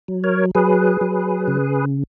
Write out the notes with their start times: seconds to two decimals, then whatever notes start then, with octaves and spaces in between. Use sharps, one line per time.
0.08 F#3
0.24 A#4 C#5
0.55 F#3 G#4 B4
1.01 F#3
1.48 C#3